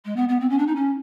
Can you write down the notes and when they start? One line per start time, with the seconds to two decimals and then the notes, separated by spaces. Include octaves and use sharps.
0.05 G#3
0.16 B3
0.29 B3
0.40 C4
0.50 C#4
0.58 D4
0.67 D#4
0.76 C#4